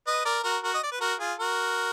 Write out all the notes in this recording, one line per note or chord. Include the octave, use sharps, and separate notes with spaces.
B4 D#5
A#4 D5
F#4 A#4
F#4 A#4
D#5
D5
B4
F#4 A#4
F4 G#4
F#4 A#4